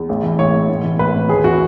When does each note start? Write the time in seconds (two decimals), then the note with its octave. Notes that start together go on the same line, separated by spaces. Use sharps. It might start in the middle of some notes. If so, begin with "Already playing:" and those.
Already playing: E2
0.09 A1
0.23 E3
0.39 A1 C#5
0.53 A2
0.69 A1
0.84 E3
0.99 A1 B4
1.14 A2
1.29 D#2 G#4
1.44 E3 F#4